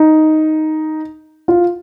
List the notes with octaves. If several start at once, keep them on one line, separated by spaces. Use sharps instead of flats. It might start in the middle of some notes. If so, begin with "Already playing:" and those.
Already playing: D#4
F4